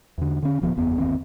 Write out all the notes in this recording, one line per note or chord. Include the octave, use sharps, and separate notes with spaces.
E2 D3
D3 C#4
D1 A#2 F3 B3
F#1 E2 B3
G1 D#2 C4